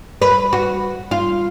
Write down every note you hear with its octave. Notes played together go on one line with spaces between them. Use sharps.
B4
F#4
F4